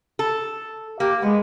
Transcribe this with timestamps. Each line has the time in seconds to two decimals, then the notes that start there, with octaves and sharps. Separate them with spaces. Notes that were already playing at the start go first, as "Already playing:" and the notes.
0.19 A4
1.00 A#3 G4
1.22 G#3 B3